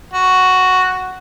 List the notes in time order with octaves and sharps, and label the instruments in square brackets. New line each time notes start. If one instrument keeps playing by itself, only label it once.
[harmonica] F#4